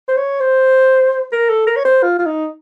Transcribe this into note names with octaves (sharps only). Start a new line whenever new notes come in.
C5
C#5
C5
A#4
A4
A#4
C#5
C5
F4
F4
D#4